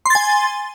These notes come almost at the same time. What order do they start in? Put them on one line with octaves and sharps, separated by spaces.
C6 A6 G#5